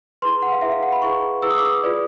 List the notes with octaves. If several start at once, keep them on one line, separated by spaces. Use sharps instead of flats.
E4 G#4 B4 C6
F#5
F5
E4 G#4 B4 E5
F5
F#5
B5
E4 G#4 B4 C#6
E4 G#4 B4 E6
D#6
D6
D#6
F4 G#4 B4 D5